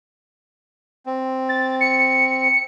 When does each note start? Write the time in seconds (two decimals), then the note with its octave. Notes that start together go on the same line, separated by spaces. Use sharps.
1.06 C4
1.49 A6
1.81 C#7